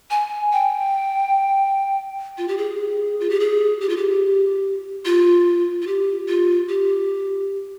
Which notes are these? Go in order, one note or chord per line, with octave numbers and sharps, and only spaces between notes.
G#5
G5
F4
G4
G#4
F4
G4
G#4
G4
F4
G4
F4
F4
G4
F4
G4